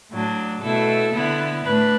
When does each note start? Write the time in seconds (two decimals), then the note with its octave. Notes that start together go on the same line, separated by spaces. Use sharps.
0.11 A2 F#3 D4
0.62 B2 A3 E4 A4
1.13 D3 B3 E4
1.65 A2 A3 D4 B4